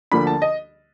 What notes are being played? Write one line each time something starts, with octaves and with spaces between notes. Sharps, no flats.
D2 D3 F3 A#3 D4 B5
A5
D#5